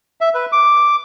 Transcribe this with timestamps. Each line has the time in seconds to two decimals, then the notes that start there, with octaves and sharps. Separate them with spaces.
0.21 E5
0.34 B4
0.52 D6